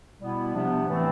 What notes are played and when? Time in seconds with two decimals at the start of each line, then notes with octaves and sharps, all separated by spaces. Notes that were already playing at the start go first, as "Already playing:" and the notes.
0.20 B2 G3 B3 E4
0.53 C3 F3 B3 D4
0.88 A2 E3 A3 C4